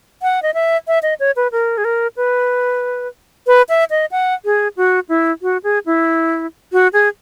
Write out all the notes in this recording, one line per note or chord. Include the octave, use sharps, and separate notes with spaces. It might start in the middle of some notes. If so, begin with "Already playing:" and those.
F#5
D#5
E5
E5
D#5
C#5
B4
A#4
G#4
A#4
B4
B4
E5
D#5
F#5
G#4
F#4
E4
F#4
G#4
E4
F#4
G#4